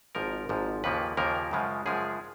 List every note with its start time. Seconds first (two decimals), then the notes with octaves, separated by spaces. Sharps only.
0.15 G#1 G#2 F3 A#4
0.49 G#1 G#2 F3
0.84 D#2 C#3 F3 A#3 B4
1.17 D#2 C#3 F3 A#3 A#4
1.51 F#2 C#3 F3 G#3
1.86 F#2 C#3 F3 G#3 G#4